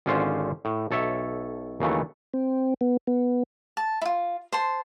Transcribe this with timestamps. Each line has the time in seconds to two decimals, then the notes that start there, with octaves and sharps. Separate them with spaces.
0.06 G#1 D3 C#4 F4 C5
0.65 A2
0.91 B1 A4 C#5 E5
1.80 D#2 C#3 E3 F#3 A3
2.34 C4
2.81 B3
3.07 B3
3.77 A5
4.01 E4 F4
4.52 C5 A5 C6